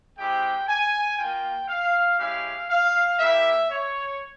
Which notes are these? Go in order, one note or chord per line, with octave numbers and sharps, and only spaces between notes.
G#3 C4 E4 G4 G5
G#5
A#3 F4 G5
F5
G#3 C#4 E4 G4 F5
F5
A#3 E4 G4 E5
C#5